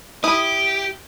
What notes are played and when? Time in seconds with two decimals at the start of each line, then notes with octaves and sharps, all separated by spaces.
0.24 E4 G4 D#6